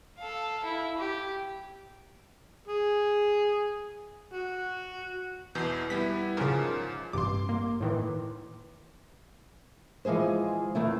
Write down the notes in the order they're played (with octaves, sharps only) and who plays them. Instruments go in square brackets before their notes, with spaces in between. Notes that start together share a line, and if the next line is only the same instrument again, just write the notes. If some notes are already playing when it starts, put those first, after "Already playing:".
[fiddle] A4 F5
E4
G4
[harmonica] G#4
F#4
[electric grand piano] E2 B2 E3 [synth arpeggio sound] G6 C7
[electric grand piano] G3 B3 E4 [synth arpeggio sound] B6
[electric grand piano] G#2 F3 [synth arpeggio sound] C#3 C#4 A#4
[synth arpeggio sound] A1 G2 C3 [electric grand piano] C6 D6
[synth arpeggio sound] A#3
A2 D#3 E3
[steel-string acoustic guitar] E3 F3 G#3 G#4 C5
E2 D#3 A3 E4